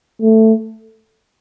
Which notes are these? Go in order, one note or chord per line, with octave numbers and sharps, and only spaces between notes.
A3